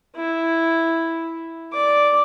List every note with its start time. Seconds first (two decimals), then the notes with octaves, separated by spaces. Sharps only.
0.15 E4
1.73 D5 D6